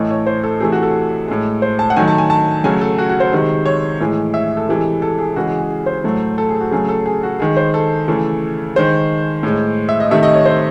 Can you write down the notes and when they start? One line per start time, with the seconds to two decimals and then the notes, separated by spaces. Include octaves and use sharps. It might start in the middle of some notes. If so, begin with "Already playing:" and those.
Already playing: A2 E3 A3 D#5
0.10 C#5
0.27 C5
0.43 A4
0.60 C3 E3 A3 G#4
0.72 F#4
0.83 A4
1.28 A2 G#3
1.62 C5
1.79 A5
1.90 F#5
1.97 D#3 F#3 A3 G#5
2.08 A5
2.18 G#5
2.30 A5
2.64 C#3 F#3 A3 G#5
2.81 A4
2.98 F#4
3.09 F#4
3.20 C5
3.32 C3 D#3 G#3
3.66 C#5
4.00 A2 E3 G#3
4.34 E5
4.57 A4
4.69 C3 E3 G#3
5.02 A4
5.19 G#4
5.36 C#3 E3 G#3 F#4
5.47 G#4
5.59 G#4
5.70 G#4
5.86 C5
6.04 A2 F#3 A3
6.38 A4
6.49 G#4
6.61 F#4
6.71 C#3 F#3 A3 G#4
6.89 A4
7.06 G#4
7.23 F#4
7.40 D#3 G#3 G#4
7.57 C5
7.74 A4
8.08 C#3 E3 A3
8.76 D#3 G#3 C5
9.43 A2 G#3
9.89 E5
10.00 D#5
10.11 C3 D#3 A3 E5
10.23 D#5
10.34 C#5
10.45 C5